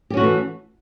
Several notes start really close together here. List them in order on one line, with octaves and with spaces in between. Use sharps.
G4 C#4 F#4 A3 E3